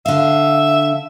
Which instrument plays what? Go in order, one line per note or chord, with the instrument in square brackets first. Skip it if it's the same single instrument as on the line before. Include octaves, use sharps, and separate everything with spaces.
[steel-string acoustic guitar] D3 F5 [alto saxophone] E5